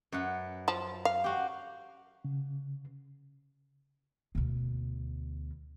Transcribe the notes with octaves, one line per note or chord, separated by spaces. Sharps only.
F#2 B4 F#5
F3 A5
F5
F#4 G4
C#3
D2 B2